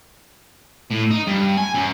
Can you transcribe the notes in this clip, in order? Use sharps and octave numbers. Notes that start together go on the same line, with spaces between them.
A2
D#4
G2
G#5
F#2